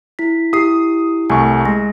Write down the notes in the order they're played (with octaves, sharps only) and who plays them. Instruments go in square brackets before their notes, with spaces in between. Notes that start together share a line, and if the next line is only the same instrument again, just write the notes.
[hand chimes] E4 B6
[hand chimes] E4 G4 C7 [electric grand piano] D#6
[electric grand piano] C2 A3 C#6 [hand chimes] G#5
[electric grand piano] G#3 [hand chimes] A#6